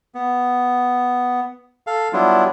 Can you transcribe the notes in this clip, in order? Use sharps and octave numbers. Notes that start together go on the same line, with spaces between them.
B3
A4 F5
F#3 G3 B3 D4 E4 F4